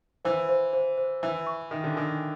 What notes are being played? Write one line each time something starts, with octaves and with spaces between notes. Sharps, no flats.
E3 C5
C5
C5
C5
E3 E5
C#6
D#3 E5
D3
D#3 G#5